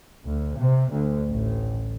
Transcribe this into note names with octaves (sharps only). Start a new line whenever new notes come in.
D2
C3
D2
A1